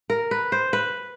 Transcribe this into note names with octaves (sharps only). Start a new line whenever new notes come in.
A#4
B4
C5
B4